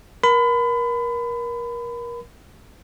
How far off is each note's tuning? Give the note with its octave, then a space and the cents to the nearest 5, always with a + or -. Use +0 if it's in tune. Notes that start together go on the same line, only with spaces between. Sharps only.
A#4 +30 B5 +30